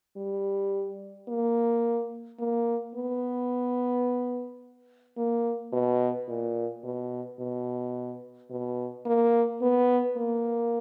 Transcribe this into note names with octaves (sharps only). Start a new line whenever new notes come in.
G3
A#3
A#3
B3
A#3
B2
A#2
B2
B2
B2
A#3
B3
A#3